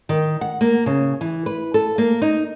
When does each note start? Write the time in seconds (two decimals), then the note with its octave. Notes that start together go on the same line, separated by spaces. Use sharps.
0.09 D#3
0.41 F#5
0.61 A#3
0.86 C#3
1.21 E3
1.46 B4
1.74 A4
1.98 A#3
2.22 D#4